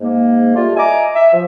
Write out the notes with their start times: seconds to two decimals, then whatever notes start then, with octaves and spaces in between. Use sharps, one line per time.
0.01 G#2 A#3
0.55 G3 A3 F4
0.76 D#5 E5 G#5 A#5 D6
1.14 E5
1.33 F3